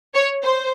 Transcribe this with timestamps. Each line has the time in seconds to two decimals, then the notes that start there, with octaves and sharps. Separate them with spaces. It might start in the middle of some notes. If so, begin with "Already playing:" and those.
0.14 C#5
0.43 C5